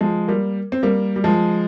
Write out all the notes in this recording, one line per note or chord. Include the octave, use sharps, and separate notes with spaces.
F3 G#3
G3 A#3
C4
G3 A#3
G3
F3 G#3